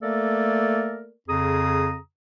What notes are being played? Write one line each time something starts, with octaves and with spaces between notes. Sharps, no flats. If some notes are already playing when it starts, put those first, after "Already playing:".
A3 A#3 A4 A#4 D5
F2 C#3 G#4 A#5 D#6